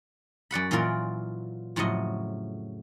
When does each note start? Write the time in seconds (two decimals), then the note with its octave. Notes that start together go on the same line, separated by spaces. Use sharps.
0.51 F#2 D5 F#5 B5
0.71 A#2 E3 F#3 F4 A#4 D5
1.76 F2 A2 C#3 F#3 D#5